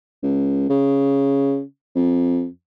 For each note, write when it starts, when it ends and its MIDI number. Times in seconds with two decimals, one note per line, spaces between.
0.23 0.66 37
0.69 1.61 49
1.95 2.46 41